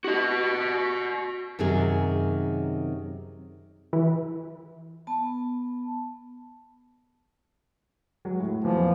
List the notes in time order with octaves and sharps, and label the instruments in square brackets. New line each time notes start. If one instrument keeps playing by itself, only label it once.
[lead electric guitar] F#4 D#5
[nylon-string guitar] F#2 C3 D#3 G#4
[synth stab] E3
[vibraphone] B3 A5
[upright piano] F#3 G#3
A2
[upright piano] E2 A#2 F#3 [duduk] F3